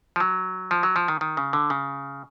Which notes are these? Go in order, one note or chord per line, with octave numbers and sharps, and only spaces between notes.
F3
F#3
F3
F#3
F3
D#3
D#3
C#3
D3
C#3